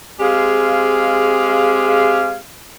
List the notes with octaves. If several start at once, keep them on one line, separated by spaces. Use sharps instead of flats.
G#3 C4 G4 G#4 F5